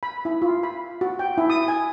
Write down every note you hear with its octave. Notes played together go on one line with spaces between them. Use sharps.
B5
E4
F4
B5
F#4
G5
E4
D#6
G#5